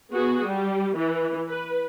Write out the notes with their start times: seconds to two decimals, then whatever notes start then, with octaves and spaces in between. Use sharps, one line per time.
0.13 B3 F#4 G#4
0.45 G3
0.97 E3
1.49 B4